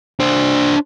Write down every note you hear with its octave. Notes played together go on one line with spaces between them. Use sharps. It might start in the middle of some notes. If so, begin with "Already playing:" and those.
D4 C5